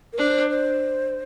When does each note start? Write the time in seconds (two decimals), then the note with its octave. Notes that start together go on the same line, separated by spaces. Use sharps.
0.13 A#4
0.18 D4 C5
0.50 C5